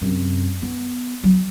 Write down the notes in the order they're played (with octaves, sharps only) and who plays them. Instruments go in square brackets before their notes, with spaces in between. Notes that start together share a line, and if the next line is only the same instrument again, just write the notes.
[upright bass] F#2 C3
B3
F#3